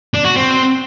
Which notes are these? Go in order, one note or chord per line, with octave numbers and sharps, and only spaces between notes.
D4
F#4
C4